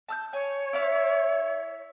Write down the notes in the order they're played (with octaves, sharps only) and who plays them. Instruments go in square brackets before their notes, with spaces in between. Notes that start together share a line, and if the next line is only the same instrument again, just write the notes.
[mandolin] A5 E6 G6
[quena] C#5 [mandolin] G#5
[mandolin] E4 E5 F5